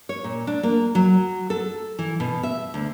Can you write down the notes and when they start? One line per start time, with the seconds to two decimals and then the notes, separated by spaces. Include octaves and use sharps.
0.09 C#5
0.24 A#2
0.47 D4
0.63 A#3
0.95 F#3
1.50 A4
1.99 E3
2.20 B2
2.43 E5
2.74 D2